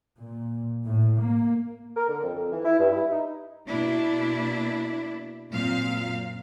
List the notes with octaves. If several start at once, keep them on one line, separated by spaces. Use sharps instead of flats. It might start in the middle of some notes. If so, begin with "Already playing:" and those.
A#2
A2
A#3
A#4
D3
F2
F2
E3
E4
G2
E4
D#4
B2 A#3 D4 E4
F#2 A#2 C4 F5